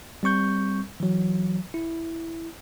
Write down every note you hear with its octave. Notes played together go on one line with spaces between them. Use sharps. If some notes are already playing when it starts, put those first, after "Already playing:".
G3 C4 C#6 G6
E3 F#3
E4